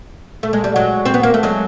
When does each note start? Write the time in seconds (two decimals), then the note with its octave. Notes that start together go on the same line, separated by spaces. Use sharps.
0.43 A3
0.53 G#3
0.64 G3
0.76 F#3 G#3
1.05 C4
1.14 B3
1.23 A#3
1.34 A3
1.43 F#3 G#3